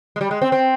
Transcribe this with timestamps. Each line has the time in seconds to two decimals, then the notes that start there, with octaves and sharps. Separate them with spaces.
0.16 G#3
0.21 G3
0.31 G#3
0.42 C4
0.52 C4